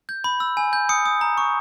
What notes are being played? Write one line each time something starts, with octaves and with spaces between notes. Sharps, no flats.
G6
B5
E6
G#5
G6
D#6 C#7
D#6
A#5
C#6